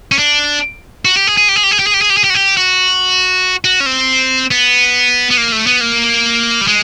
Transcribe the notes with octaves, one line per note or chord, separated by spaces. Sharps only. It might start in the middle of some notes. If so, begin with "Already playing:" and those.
C#4
D4
F#4
G4
G#4
G#4
G4
G#4
G4
G#4
G4
G#4
G4
G#4
G4
G#4
G4
F#4
G4
F#4
F#4
C#4
C4
B3
B3
A#3
A3
B3
A#3
G3
G#3